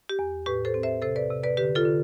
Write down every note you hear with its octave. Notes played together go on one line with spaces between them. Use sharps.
G4
E2
A2 G4 B4
A4 C5
C4
C5 E5
C3 A4 C5
B4 D5
C3
B4 D5
D3 G4 B4
F4 A4
D3